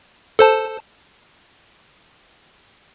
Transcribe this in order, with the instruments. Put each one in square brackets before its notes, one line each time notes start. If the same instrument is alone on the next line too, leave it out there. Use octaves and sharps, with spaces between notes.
[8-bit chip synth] A4 C5 A5